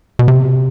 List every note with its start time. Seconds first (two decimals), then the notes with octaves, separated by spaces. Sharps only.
0.19 B2
0.28 C3